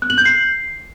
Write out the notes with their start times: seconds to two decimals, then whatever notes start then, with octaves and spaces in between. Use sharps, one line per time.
0.02 F#6
0.10 F#7
0.18 G6
0.25 C7